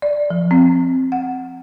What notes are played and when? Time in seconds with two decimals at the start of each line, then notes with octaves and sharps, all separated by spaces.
0.02 D5
0.30 F3
0.51 C4
1.12 F#5